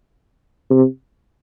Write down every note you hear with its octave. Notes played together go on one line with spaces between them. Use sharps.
C3